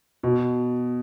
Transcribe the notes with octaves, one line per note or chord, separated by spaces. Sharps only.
B2